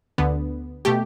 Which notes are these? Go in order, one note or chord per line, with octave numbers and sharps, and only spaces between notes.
D2 D3 B3
B2 A3 G4